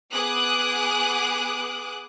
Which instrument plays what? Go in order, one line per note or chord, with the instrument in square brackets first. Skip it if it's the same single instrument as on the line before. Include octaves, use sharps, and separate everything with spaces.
[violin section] B3 G#4 D6 D#6 F#6